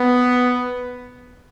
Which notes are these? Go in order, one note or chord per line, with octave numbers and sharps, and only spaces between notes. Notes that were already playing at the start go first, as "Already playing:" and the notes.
Already playing: B3